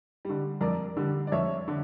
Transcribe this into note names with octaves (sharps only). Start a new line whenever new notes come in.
D3 G3
F2 A#4 D5
D3 G3
D5
F2 C#5 E5
D3